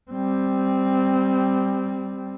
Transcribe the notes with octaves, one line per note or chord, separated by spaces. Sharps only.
G3 C4